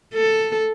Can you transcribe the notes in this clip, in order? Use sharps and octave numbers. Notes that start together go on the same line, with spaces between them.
A4